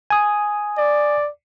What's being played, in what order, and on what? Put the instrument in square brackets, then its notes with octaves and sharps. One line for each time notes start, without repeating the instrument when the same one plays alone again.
[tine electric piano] G#5 D#6
[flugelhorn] D5